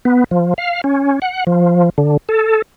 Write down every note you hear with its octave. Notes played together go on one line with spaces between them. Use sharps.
B3
F3
F5
C#4
F#5
F3
D3
A4